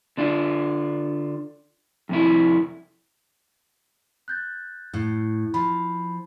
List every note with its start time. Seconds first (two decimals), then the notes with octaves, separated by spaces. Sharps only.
0.17 D3 D4 F4
2.09 F2 C3 E4
4.28 F#6 G6 A6
4.94 A2
5.54 F3 B5